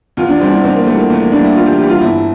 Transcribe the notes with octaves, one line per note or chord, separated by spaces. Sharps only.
E2 F4
D4
E3 G3 C4
D4
E2 C4
A#3
E3 G3 A3
A#3
E2 A3
A#3
E3 G3 D4
E4
E2 F4
G4
E3 G3 G4
F4
G1 E4